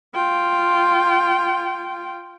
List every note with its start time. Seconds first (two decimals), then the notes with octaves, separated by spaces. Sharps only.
0.14 F4 G5